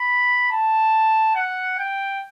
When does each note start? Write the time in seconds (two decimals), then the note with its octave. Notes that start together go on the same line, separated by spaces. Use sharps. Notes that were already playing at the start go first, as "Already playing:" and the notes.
Already playing: B5
0.51 A5
1.35 F#5
1.78 G5